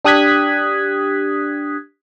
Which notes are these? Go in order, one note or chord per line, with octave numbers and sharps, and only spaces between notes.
D4 G4 D#6 F#6 G#6 B6